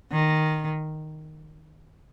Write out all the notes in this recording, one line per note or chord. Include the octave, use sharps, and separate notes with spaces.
D#3